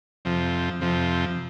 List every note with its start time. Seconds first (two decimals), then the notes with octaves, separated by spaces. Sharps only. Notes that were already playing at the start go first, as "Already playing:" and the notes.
0.25 F2 C3 F3
0.81 F2 C3 F3